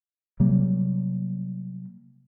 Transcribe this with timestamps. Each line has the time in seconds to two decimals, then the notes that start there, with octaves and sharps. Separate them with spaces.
0.40 C3 F#3 G3 A#3